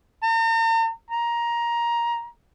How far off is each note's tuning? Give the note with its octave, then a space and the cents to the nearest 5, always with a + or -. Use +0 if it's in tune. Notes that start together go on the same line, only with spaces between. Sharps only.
A#5 -45
A#5 +15